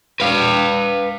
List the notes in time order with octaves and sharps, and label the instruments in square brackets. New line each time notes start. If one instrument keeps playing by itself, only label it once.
[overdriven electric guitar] B4 F5